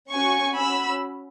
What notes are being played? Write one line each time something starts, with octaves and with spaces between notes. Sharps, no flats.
C#4 F#4 G#5 C#6
C#4 F#4 B5 E6